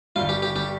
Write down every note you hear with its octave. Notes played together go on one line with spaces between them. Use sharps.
G1 G2 G3 F4
G4
G4
G3 G4